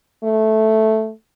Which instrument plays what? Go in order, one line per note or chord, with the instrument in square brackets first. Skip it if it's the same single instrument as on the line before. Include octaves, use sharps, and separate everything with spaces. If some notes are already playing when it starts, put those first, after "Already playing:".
[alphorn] A3